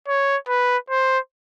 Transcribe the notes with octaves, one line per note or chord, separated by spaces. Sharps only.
C#5
B4
C5